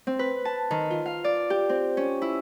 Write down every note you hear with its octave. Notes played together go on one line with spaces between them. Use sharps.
C4
B4
A5
D#3
F4
F5
D5
G4
C4
C#4
E4